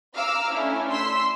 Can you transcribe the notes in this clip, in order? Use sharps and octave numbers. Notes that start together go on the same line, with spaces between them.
F5 A#5 D6 E6 F6
A3 C#4 D4 E4
C6 E6 B6